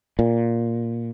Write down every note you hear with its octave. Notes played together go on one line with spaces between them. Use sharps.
A#2